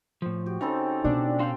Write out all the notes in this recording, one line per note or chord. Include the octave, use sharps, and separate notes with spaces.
A2 F3
F#4 G4
C#3 C4 D#4 A4
B2 D4
F#4 F5 G5 C6